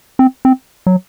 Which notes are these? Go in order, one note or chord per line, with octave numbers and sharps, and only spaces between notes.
C4
C4
F#3